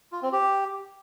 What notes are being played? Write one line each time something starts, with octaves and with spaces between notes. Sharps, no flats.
F4
C4
G4